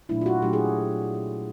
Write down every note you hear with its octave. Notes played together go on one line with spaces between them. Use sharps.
A#2 F#3 A3 D4 E4
F4
F#4
A#2 F#3 A3 D4 G4
G#4